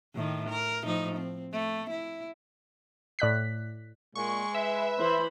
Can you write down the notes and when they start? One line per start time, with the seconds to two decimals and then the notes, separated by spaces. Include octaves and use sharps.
0.15 A2 D#3
0.49 A#4
0.84 A2 F3 D#4
1.17 C4
1.52 A3
1.90 E4
3.19 A2 D5 F#6 B6
4.15 A#2 G#3 C#6
4.55 B4 E5
4.98 E3 C5 B5